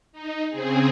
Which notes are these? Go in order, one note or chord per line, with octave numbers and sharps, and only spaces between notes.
D#4
C#3 C4 G#4